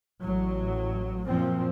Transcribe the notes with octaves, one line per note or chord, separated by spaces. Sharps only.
A1 A2 F#3
F#2 A#2 F3 C4